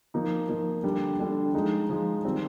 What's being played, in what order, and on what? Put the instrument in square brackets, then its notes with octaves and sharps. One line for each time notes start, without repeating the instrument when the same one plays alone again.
[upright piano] F3 A#3 D#4
F3 A#3 D#4
D3 G3 D4
D3 G3 D4
F3 G#3 D#4
F3 G#3 D#4
D#3 G3 C4